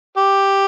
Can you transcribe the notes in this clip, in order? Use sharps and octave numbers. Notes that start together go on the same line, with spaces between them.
G4